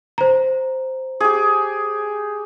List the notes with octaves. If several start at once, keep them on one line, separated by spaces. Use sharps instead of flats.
C5 A#5
G4 G#4